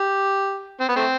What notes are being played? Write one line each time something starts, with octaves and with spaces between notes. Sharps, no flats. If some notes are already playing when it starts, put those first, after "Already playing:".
Already playing: G4
C4
B3
A3 C4